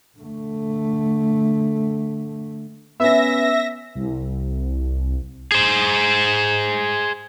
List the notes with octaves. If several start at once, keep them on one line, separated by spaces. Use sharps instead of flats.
D3 A3
B3 C#4 E5 A#6
C2
G#4 C5